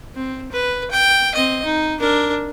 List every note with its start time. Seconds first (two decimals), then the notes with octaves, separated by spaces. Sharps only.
0.15 C4
0.52 B4
0.91 G5
1.35 C4 D#5
1.65 D#4
2.00 D4 A#4